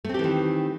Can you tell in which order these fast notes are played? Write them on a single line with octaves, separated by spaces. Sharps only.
A3 C4 G4 E3 D#3